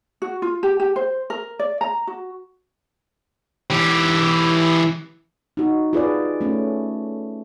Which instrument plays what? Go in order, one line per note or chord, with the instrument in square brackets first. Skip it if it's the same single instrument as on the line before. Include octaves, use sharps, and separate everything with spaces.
[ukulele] F#4
F4
G4
G4
C5
A#4
D5
A#5
F#4
[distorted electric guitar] E3 G4
[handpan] D#4 F#4
F4 G#4 B4 D5
A3 C#4